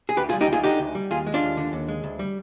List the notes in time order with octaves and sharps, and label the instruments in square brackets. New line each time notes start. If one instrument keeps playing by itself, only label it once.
[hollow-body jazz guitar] G#4
D2 G4 B4
F4 G#4
G3
D#4 G4
D2 F4 G#4
D3 D#4 G4
D2
G3
D#2 F4 G#4
G#3
D4 F4
D#2
D3
D#2
G#3
D2
G3